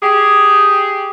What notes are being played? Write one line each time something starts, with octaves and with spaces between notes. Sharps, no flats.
G4 G#4